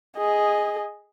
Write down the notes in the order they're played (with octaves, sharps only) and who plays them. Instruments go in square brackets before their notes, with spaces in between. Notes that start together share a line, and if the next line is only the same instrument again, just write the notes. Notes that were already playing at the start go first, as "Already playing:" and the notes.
[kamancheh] G#4 D#5